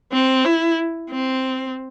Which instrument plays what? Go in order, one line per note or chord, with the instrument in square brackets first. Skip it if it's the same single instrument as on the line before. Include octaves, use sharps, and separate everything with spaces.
[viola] C4
E4
C4